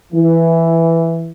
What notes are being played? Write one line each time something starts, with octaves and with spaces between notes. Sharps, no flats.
E3